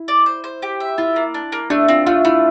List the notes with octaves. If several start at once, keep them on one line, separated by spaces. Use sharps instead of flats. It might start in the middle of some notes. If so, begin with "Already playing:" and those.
Already playing: E4
D5
C5
C5
G4
E5
E4 F4
A#3
D4
A#3
A3 D4
C4 F4
A3 F4
A3 E4